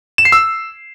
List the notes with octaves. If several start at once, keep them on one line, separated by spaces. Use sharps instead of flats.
E7
C7
E6